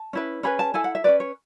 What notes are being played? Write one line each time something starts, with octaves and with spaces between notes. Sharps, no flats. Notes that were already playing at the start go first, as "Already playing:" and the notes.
Already playing: A5
C#4 E4 B4
C#4 G#4 B4 B5
A5
E4 A4 G#5
F#5
E5
C#4 F#4 B4 D5
C#5